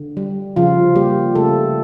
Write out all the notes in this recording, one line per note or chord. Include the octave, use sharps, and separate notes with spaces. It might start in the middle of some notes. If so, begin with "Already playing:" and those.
Already playing: D3
G3
C#3 F3 F4
G3 A#3 G4
C#3 A3 A4